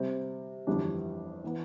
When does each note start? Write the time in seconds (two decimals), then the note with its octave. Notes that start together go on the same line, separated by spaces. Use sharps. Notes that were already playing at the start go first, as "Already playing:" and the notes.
Already playing: C3 G3 C4
0.67 G1 F2 E3 G3 D4
1.44 E3 B3